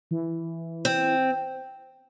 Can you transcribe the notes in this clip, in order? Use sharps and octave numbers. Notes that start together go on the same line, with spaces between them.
E3
C4